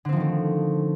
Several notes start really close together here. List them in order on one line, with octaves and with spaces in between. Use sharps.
D3 C4 F3 D#3 A3